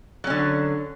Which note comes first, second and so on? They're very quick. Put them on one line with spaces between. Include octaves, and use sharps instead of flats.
F#3 C#4 D3